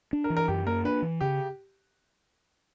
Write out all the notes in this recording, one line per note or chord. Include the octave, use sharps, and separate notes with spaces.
D4
A#4
E3
A#4
F#2 G4
A#3 A#4
D4 B4
E3
C#3 G4